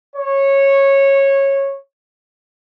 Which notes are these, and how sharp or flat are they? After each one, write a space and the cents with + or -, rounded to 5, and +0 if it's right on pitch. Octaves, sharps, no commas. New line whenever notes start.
C#5 -15